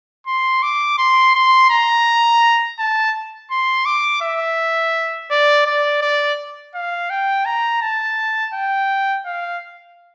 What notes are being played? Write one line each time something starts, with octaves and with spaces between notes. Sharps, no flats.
C6
D6
C6
C6
A#5
A5
C6
D6
E5
D5
D5
D5
F5
G5
A#5
A5
G5
F5